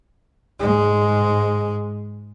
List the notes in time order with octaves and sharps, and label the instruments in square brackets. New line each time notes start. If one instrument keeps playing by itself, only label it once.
[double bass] G#2 G#3